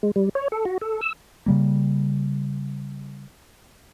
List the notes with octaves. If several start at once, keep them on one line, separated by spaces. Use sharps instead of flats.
G#3
G3
C#5
A4
F#4
A4
E6
C#3 G3 A#3